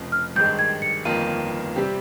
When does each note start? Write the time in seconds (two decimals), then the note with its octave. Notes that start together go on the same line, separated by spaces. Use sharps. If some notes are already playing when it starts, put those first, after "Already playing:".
Already playing: F1 F2 C#3
0.12 F6
0.36 G#1 G2 D#3 G#3 G6
0.59 G#6
0.82 C#7
1.05 G1 F2 D#3 A#3 F4 D#7
1.76 C3 G3 C4 G4